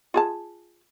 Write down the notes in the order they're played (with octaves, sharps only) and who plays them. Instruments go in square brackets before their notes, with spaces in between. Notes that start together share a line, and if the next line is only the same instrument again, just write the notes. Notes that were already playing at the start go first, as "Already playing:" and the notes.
[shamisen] F4 G#4 A5